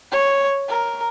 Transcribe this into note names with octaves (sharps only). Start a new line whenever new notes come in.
C#5
A#4